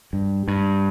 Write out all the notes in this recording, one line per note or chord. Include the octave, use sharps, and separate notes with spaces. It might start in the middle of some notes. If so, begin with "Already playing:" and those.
G2
G2